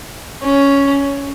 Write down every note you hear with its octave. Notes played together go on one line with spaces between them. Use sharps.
C#4